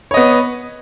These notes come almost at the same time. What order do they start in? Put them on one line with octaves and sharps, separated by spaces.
C#5 D#5 B3